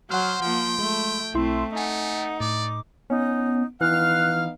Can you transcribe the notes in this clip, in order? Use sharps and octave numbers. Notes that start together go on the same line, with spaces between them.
F#3 C5 F#5 C6 F6
F3 A#3 G5
G#3 A3
B1 A3 C4 E4 C6
A3 D#4 F#5 G#5
A2 D5 D6
B3 C#4 D#4
E3 B3 D#4 F5 F6 F#6